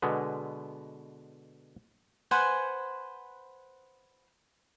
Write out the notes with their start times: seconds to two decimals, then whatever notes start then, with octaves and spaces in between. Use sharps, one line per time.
0.02 B2 D3 G#3 B3
2.31 B4 C5 F#5 G#5